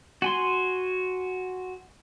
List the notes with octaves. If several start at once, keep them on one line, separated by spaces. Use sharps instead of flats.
F#4 G#5 C6